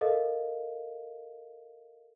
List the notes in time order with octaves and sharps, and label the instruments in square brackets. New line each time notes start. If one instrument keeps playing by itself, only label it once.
[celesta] A4 A#4 D#5 F5